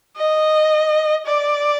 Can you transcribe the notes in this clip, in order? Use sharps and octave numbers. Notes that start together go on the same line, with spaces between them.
D#5
D5